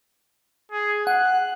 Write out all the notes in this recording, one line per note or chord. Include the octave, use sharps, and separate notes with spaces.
G#4
F#5 F#6